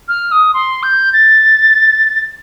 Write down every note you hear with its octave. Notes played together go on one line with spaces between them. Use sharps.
F6
D#6
C6
G6
A6